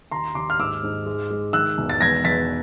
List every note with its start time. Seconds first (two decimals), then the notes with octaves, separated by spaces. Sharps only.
0.11 D#2 A#5 C6
0.35 D#2 C6 D6
0.50 F6
0.59 G#2 D6 E6
0.83 G#2
1.06 G#3
1.30 G#3
1.53 D#3 E6 F#6
1.78 E1
1.90 A6
2.01 E2 G#6 A#6
2.24 E2 A6 B6